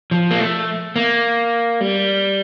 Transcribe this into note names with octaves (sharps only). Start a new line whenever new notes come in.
F3
A#3
A3
A#3
G3